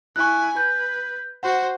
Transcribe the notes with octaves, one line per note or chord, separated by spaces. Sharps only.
E4 G#5 C#6 F#6
B4 G6
F#4 C5 F#5